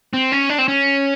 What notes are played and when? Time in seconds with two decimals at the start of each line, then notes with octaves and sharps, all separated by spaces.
0.14 C4
0.32 C#4
0.50 D4
0.58 C4
0.68 C#4